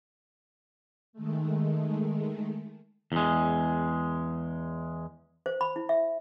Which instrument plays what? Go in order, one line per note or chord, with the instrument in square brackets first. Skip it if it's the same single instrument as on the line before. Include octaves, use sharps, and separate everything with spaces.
[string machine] D#3 G#3 A3
[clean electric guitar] E2 G#3
[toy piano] C5
B5
E4
E5